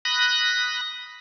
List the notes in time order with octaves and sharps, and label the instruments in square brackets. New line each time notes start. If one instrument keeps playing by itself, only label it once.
[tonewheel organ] B5 D#6 F#6 A#6